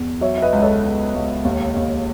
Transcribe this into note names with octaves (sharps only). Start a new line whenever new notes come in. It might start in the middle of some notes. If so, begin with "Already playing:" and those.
Already playing: E2
F#3 C#5 E5
E5
B4 D#5
C#2
D#5
A4 C#5
C#2
C#2
D#2
D#2